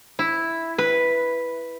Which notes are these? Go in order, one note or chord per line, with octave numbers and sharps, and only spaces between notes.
E4
B4